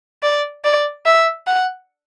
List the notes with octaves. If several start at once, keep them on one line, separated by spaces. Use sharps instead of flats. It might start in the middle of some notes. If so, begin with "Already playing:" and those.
D5
D5
E5
F#5